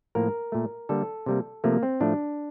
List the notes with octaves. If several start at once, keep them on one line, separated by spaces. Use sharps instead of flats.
A2 F3 A#3 A#4
A#2 A3
D3 G3 A#3 A4
C3 G3 A#3
C3 F3 A3 A#3
C4
A2 F3 A3 D4